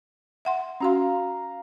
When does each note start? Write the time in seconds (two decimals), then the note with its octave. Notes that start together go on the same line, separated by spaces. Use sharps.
0.45 E5 F#5 C6
0.80 C#4 F#4 F5 A#5 C6